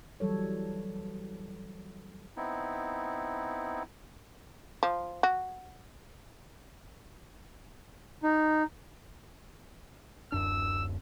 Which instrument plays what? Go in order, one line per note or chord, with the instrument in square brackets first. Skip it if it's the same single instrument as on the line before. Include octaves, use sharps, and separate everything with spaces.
[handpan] E3 F#3 G3 A4 C#5
[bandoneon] B3 C4 D#4 E4
[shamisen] F3
F#4
[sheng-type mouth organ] D#4
[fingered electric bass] D1 F#2 D4 [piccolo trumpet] E6